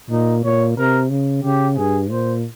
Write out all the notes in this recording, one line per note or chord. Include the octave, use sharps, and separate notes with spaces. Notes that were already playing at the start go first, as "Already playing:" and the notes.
A#2 D#4
A#2 C#5
C3 A#4
C#3
C#3 G4
G2 G#4
A#2 C5